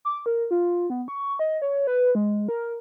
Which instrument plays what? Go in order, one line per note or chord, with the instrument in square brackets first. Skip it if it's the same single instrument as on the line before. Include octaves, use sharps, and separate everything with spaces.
[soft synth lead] D6
A#4
F4
B3
C#6
D#5
C#5
B4
G#3
A#4